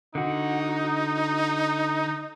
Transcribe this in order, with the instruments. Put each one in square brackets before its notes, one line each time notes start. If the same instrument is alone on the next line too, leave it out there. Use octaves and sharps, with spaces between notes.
[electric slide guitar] D3 F#4 [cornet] D#4